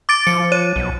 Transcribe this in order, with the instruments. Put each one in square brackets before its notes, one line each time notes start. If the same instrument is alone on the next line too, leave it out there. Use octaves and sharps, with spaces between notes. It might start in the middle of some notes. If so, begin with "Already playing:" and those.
[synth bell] D6 A6 D7
[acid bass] F3 [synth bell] C#7
[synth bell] C#5 D#7
[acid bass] B1